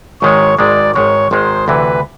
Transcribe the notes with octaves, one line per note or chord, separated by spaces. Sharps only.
G#1 G#2 D#3 G#3 C#5
G#1 G#2 D#3 G#3 D5
G#1 G#2 D#3 G#3 C#5
G#1 G#2 D#3 G#3 C5
D2 C3 E3 B4